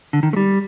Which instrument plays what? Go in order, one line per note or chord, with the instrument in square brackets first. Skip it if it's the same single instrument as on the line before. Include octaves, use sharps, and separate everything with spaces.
[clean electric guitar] D3
D#3
A3
G3